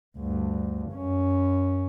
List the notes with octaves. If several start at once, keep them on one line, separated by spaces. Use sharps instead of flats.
D2 G2
F#2 C#4